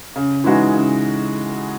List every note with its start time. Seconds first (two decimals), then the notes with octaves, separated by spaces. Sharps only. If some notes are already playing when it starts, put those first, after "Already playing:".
0.16 C#3
0.44 E3 G#3 D#4 F#4
0.73 C#3